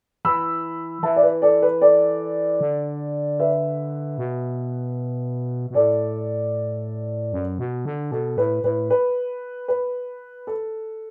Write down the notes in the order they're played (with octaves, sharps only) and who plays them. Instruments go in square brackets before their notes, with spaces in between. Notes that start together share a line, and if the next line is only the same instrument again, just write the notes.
[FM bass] E3 [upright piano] B5 E6
[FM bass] E3 [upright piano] E5 A5
[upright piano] D5
B4
A4 D5
B4
A4 D5
[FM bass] D3
[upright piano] B4 E5
[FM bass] B2
B2
[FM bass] A2 [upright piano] A4 D5
[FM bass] F#2
B2
D3
[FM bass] B2 [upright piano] A4
[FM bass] A2 [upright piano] B4
[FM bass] A2 [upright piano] B4
[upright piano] B4
B4
A4